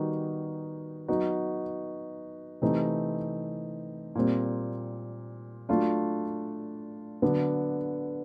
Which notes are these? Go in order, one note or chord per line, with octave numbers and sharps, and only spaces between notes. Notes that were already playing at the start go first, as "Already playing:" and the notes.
Already playing: D#3 G3 B3 D#4 F#4
F#3 B3 D#4 F#4
C3 E3 A3 C4 D#4
A#2 G3 C4
F#3 A3 D4 F4
D3 F#3 B3